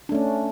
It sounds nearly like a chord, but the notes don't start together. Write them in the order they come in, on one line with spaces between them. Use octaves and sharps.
D4 A3 C#4